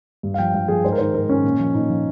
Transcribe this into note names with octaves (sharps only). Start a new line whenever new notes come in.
G2
F5
F3 G5
G2 F5
F3 G#4
G#2 C5
A#4
D#3 C5
G#2 A#4
D#3 C#4
A#2
F3
A#2 D#4
F3